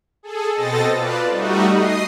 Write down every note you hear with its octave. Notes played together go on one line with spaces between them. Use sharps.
G#4 A4
B2 C4 A4 D#5 A6 A#6
F4 B4 D5 A5
G3 A3 D#4 F#4
D#5 D#6 C7